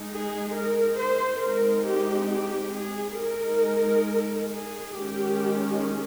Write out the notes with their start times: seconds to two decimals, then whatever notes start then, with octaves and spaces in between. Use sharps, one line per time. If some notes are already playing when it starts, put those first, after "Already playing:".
Already playing: G#3 D#4
0.11 G#4
0.54 A#4
0.98 C5
1.42 G#3 C4 D#4 A#4
1.87 G4
2.31 G4
2.76 G#4
3.20 G#3 D#4 A#4
4.52 G#4
4.96 D#3 G#3 C#4 G4